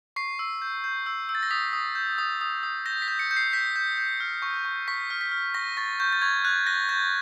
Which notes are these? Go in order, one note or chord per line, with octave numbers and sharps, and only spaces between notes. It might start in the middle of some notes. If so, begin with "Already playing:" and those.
C#6 C7
E6
G6
G6
E6
E6
A6
A#6
D#6 B6
D#6
G6
D#6
D#6
D#6
G6 A#6
B6
G6
C#7
G6
C7
G6 B6
G6
G6
F6
C#6
C#6
C#6 B6
F6
B6
F6
C#6 A#6
C#6 A6
C#6 G6
A6
C#6 G#6
F#6 G#6
F#6 A#6
G6 A6